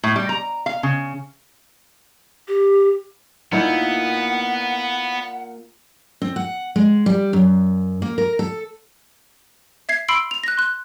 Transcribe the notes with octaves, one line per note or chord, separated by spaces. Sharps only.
A2
G3
A#5
F5
C#3
G4
A#2 A#3 B3 D#4 E4 F#5
C4
F#5
G#3
G3
F#2
A#3
A#4
A4
E5 G#6 C7
B5 C6 E6 C7 D7 F#7
F7
F#6 A#6
C6 F#6